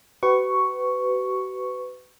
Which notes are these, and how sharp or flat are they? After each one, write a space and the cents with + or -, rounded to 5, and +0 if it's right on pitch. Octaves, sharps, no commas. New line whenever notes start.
F#4 +40 B4 +25 C#6 +0